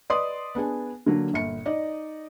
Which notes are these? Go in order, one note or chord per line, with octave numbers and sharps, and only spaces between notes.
B4 D5 D#5 C6 D#6
B3 D4 G#4 G#5
D3 F#3 A#3
G1 A#2 C#7
D#4 D5 D#5